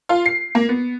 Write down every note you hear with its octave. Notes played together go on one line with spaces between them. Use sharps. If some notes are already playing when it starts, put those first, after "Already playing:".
F4
C7
A#3
B3